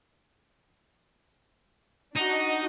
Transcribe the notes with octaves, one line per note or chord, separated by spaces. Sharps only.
D4 D#4 F#4 D#5